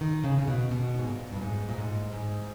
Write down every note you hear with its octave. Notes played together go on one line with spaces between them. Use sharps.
D#3
C#3
C#3
B2
B2
G#2
A#2
G2
G#2
A#2
G#2
G#2